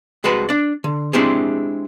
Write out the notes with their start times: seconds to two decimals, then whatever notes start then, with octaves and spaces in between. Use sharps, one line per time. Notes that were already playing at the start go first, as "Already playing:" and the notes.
0.24 C2 G#3 F#4 B4 A5
0.49 D4 D5
0.84 D3
1.13 G#3 C4 D4 E4 G4 G#4